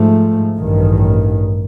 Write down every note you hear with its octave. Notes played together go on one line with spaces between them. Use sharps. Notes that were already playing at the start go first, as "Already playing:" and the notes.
Already playing: G#2 F3 A3
A1 G2 D#3